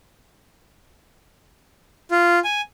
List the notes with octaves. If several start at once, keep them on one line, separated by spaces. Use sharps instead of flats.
F4
G#5